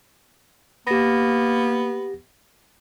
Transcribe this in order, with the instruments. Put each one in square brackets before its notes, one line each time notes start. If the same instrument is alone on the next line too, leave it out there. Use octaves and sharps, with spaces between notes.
[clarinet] A#3 [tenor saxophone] B3 [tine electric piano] G4 A#6